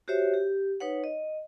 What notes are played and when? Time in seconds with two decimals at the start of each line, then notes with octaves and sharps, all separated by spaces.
0.08 F#4 G4 C5 C#5 E5
0.34 G4
0.80 D#4 B4 C#5 F#5
1.04 D#5